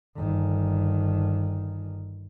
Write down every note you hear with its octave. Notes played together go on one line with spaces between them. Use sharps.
G1 D#3